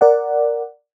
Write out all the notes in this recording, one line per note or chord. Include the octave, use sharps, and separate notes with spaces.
A#4 D5 F#5